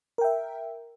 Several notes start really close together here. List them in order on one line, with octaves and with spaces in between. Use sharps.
A#4 G5 E5